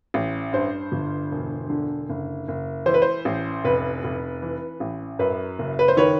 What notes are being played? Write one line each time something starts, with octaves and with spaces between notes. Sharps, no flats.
A1
G2 C5
G1
E1
D3
F#1
F#1
E3 C5
B4
C5
A1
F1 B4
F1
E3
A1
F#2 B4
F#1
B4
C5
D#3 B4 C#5